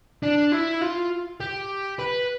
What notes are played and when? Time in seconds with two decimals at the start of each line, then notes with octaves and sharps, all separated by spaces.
0.23 D4
0.52 E4
0.82 F4
1.40 G4
1.99 B4